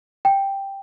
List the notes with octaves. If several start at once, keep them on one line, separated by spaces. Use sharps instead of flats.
G5